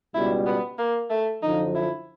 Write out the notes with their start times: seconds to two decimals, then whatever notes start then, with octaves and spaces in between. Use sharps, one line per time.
0.14 C#2 B2 G3 E4
0.46 B3
0.78 A#3
1.10 A3
1.42 F#2 D3 F3 D#4
1.75 E4